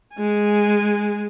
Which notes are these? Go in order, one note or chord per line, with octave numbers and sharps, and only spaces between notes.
G#3 G#5